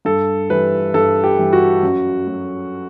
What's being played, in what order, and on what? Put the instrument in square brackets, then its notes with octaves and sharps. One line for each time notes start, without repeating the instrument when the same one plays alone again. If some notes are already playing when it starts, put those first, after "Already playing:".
[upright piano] G2 A4
E3 G3 B4
G2 A4
G4
E3 G3
F#4
F#2
F#3